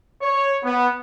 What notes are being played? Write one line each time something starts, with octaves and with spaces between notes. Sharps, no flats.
C#5
B3